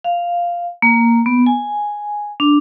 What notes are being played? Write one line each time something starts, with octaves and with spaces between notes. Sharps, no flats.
F5
A#3
B3
G#5
D4